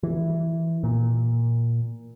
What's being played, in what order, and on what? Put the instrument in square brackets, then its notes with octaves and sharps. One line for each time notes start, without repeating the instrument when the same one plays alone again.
[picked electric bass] E3
A#2